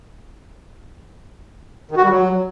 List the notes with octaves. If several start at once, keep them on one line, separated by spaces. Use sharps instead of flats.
D#3
F#4
G3
F#3